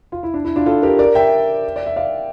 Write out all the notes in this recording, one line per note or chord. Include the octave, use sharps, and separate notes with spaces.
F4
E4
D4
E4
D4 F4
F4 A4
G4 A#4
A#4 D5
E5 G5
D5
E5
D5 F5